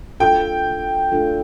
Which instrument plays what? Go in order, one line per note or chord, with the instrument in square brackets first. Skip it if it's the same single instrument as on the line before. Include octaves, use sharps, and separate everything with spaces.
[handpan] A3 D4 F4 A4 [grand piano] G5
[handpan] A3 D4 F4 A4